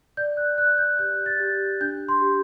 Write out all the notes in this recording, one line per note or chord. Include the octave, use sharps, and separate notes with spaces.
D5 G6
F#6
D5 F#6
G6
G4 G6
A6
G4
D4 G6
C6
G4